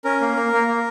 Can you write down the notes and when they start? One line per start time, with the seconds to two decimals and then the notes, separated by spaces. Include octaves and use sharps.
0.04 C#4 A#4
0.21 A#3
0.37 A#3
0.52 A#3
0.68 A#3